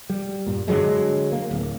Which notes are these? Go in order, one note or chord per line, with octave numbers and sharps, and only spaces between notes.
G3
G2 A#2
D3 E3 F#3 G#3
A#3
D1